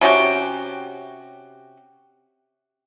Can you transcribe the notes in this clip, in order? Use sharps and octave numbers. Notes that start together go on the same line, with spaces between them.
C3 C#4 F#4 G4